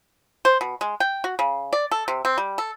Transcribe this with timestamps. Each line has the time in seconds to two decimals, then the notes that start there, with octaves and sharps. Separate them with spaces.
0.45 C5
0.61 B2
0.81 G#3
1.00 G5
1.24 F#4
1.39 C#3
1.73 D5
1.91 A4
2.08 C3
2.25 C4
2.38 G3
2.58 A4